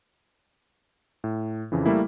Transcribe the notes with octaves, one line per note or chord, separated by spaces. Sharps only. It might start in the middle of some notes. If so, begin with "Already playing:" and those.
A2
F2 C#3 E3
G3 A3 A#3 E4